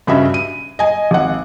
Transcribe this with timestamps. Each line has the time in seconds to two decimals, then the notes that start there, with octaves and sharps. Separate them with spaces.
0.07 G2 C#3 F#4 E5
0.34 D#7
0.79 D#5 G#5
1.11 G#1 F#5